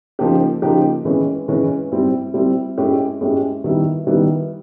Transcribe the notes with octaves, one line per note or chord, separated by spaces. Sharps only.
C#3 F3 A#3 D#4 G4
C#3 F3 A#3 D#4 G4
E3 G#3 C#4
E3 G#3 C#4
G3 C4 E4
G3 C4 E4
G#3 C#4 E4 G4
G#3 C#4 E4 G4
D#3 G3 B3 E4
D#3 G3 B3 E4